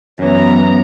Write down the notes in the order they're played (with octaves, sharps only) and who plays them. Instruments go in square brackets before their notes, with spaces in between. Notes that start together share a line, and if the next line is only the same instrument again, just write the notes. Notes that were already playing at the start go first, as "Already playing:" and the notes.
[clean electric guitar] F#2 E3 [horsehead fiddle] B3 A#5 [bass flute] C#5